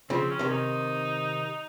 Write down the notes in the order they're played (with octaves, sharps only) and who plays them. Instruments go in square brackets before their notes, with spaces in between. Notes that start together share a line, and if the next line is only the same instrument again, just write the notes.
[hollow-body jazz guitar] C#3 F3 [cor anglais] C4
[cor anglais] C#4
[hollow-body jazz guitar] C3 D#3
[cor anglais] D#4